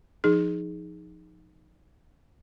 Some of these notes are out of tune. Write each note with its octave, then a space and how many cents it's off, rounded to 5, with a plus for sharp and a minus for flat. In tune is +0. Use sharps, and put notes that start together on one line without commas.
F3 +0 D#4 +0 G#4 +0